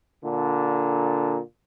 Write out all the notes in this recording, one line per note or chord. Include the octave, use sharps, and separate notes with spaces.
A#2 D3